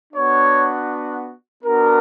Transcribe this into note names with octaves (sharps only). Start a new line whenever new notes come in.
B3 D4 F#4 C#5
B3 D4 F#4 A#4